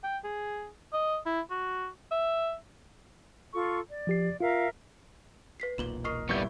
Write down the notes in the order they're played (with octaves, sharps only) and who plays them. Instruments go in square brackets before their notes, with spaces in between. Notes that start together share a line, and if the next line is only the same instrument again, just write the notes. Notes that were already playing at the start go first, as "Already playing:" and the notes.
[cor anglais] G5
G#4
D#5
E4
F#4
E5
[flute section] F4 A4 C#6
D5
[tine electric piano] F3 G4 C7
[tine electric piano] F4 [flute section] A#4 E5 F5
[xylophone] B4 B6 C7
[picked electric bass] E1 B1 A#2 [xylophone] E7 F#7 G7
[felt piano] A#4 D#6 F6 [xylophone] D#5 C#6 C7
[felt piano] G#1 E4 G6 [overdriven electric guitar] G3 B3 [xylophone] C#6